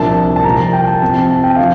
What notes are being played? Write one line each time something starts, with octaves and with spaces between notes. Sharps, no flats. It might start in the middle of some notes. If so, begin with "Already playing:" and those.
Already playing: C2 A#2 F3 A#3 D4 A5
A5
C2 A#2 F3 A#5
A5
G5
A5
C3 F3 C4 A5
A5
A5
G5
D3 F3 F5